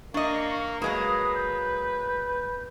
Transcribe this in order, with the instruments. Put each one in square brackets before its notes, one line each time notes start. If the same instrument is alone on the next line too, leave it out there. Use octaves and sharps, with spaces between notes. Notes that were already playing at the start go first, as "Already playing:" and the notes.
[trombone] A#3 [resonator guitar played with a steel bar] D4 D#5 [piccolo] C#6
[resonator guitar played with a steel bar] F#3 G#3 A#3 [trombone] B4 [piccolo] D#6
[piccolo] G6